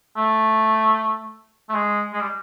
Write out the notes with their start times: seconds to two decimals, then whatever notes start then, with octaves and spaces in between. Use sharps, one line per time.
0.17 A3
1.69 A3
1.74 G#3
2.13 G#3
2.21 G3